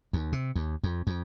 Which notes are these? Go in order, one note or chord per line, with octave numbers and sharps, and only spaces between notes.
D#2
C3
D#2
F2
F2